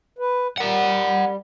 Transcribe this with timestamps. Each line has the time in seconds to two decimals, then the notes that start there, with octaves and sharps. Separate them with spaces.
0.19 B4
0.58 G3 A#4 F#5